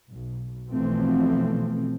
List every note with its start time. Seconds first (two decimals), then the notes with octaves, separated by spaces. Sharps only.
0.10 B1
0.71 B1 E3 F3 A3 C4